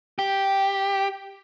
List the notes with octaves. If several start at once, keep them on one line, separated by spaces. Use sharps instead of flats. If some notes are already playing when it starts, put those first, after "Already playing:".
G4